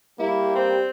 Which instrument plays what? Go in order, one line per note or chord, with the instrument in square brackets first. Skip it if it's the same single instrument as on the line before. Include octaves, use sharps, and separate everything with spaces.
[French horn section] G3 G4 [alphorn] A#3 [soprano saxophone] E4
[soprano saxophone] C4